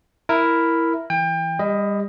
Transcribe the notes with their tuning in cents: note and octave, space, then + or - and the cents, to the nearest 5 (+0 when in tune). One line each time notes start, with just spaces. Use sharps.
E4 +0 A#4 +0
E3 +0 G5 +30
G3 +30 D#5 +0